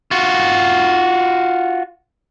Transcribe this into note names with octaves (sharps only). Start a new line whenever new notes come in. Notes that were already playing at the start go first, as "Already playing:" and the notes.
F4 F#4